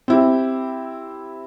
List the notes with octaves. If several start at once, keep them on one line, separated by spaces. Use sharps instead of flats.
C4 E4 G4